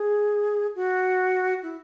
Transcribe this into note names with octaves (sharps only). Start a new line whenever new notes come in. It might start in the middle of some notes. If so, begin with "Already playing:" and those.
Already playing: G#4
F#4
E4